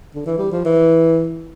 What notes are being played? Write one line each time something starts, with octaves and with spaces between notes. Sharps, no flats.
D3
E3
G3
F3
E3